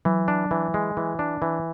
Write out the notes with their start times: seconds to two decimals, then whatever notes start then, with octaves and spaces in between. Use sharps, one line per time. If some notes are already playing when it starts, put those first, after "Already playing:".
0.05 E3 F#3
0.28 D4
0.51 E3
0.74 G#3
0.97 E3
1.19 D4
1.42 E3